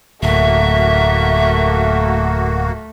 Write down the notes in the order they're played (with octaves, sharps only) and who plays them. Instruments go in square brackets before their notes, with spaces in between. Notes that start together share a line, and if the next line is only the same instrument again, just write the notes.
[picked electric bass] D1 [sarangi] A3 [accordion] A#3 F#4 [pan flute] E5